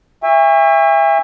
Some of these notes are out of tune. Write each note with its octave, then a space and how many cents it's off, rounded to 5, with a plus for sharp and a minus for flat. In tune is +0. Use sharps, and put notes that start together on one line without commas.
E5 +10 G#5 -45 C#6 +0